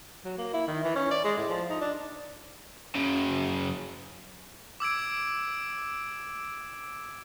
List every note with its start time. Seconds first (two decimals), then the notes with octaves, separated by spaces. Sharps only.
0.25 F#3
0.38 A#3
0.53 E4
0.68 D#3
0.84 E3
0.95 C#4
1.11 D5
1.24 G#3
1.37 A2
1.49 F3
1.70 D#4
1.81 D4
2.95 F#2 C#3
4.80 D6 E6 G#6 D7